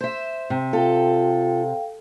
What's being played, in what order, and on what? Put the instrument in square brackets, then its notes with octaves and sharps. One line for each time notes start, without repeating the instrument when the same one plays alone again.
[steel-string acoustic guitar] C5 E5
[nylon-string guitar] C3
[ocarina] F4 [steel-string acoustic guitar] A4 [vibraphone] F5 G5